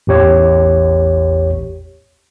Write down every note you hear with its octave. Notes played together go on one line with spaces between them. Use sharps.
A1 E2 G4 C#5